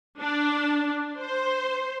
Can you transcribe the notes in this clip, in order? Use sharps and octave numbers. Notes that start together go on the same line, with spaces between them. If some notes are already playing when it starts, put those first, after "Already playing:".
D4
C5